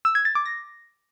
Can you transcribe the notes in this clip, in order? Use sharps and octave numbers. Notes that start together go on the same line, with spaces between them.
E6
G#6
A6
D6
A#6